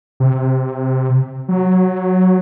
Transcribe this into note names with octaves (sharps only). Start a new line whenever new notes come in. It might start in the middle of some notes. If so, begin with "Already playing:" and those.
C3
F#3